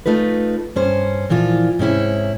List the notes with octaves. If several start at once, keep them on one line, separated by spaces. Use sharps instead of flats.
A3 D#4 F4 B4
G2 C#4 C5
A#2 E3 F3 F4
G#2 C3 C#4 E4